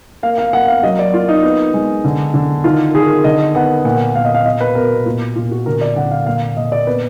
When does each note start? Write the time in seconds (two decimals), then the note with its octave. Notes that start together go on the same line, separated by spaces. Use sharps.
0.23 A#3 F5
0.38 F5
0.53 A#3 F#5
0.68 F5
0.83 F#3 D#5
0.99 D5
1.13 A#3 F4
1.29 D#4
1.43 B3
1.74 G#3
2.04 D3
2.34 D3
2.64 D#3 F4
2.94 D#3 G#4
3.24 D3 D#5
3.55 B3 F#5
3.85 A#2 F#5
4.15 A#2 F5
4.25 D#5
4.34 F5
4.46 B2 D#5
4.61 B4
4.75 B2 A#4
5.06 A#2 F4
5.36 A#2 F4
5.51 F#4
5.66 D3 A#4
5.81 D5
5.96 D3 F#5
6.11 F5
6.26 A#2 F5
6.56 A#2 D#5
6.72 D5
6.87 B3 B4